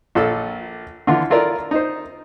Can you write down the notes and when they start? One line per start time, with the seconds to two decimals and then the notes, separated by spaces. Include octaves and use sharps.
0.15 A#1 A#2 A4 E6
1.07 D3 E3 F4
1.30 E4 F4 A4 A#4 D5
1.71 D#4 C5